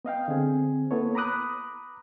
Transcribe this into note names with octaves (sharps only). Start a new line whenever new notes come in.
B3 D#5 F5 G5
D3 C4 G#4
A#3 B3 E4 A4 B4 C#5
A#5 B5 D6 D#6 F#6